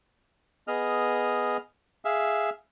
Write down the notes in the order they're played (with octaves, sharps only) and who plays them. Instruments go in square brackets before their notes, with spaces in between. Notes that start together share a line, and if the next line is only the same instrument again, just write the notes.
[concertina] B3 G#4 D#5 F6
G#4 E5 F5